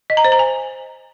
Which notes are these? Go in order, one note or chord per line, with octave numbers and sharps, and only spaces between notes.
D#5
A#5
C5
A#5
G#5